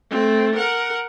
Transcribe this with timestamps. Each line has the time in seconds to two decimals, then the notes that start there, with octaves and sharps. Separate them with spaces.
0.10 A3 C4
0.56 A#4 F#5